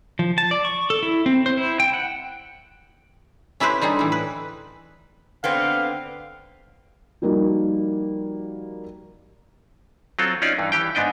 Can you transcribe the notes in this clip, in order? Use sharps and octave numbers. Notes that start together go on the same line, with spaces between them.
F3
A5
D5
C#6
A4
E4
C4
C5
E4
G5
F#5
C#4 E4 G4 B4 C5
D3 G3 D#4 G#4
A2 E3
B4
D3 B3 C4 F5
F3 G3 A#3 D#4 F#4
F#3 C4 F4 A4
C#4 D#4 F4 D5
G2 E3
E3 G4 G5
G#2 B3 D4 D#5 G5